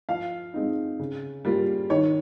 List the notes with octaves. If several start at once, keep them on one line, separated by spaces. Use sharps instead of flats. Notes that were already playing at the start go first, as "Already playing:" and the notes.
F3 F5
G#3 C4 D#4
C#3
G3 A#3 F4
D#3 C#5